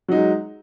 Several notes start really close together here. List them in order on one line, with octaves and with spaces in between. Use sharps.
F#3 D#4 G#3